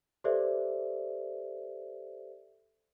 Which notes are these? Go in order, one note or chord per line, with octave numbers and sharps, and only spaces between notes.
G4 A4 B4 C5 D5 E5